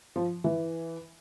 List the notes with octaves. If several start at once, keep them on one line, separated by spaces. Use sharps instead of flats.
F3
E3